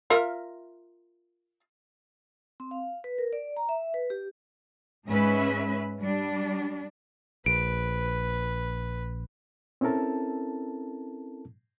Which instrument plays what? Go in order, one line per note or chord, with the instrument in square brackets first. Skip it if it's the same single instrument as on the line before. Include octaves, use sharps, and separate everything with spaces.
[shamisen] F4 A#4 E5
[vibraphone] C4
F5
B4
A#4
D5
A#5
E5
B4
G4
[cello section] G#2 G#3 C#4 B4 E5
G3 D4
[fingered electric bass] A#1 [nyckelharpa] B4 [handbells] D7
[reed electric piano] C4 C#4 E4 A4 A#4 A5